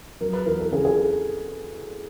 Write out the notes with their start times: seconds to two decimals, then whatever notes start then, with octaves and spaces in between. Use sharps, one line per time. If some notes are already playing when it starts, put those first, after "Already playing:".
0.21 F#3 A#4
0.33 B4
0.46 E2 A#4
0.60 A4
0.72 C#3 G#4
0.85 G#4
0.98 A4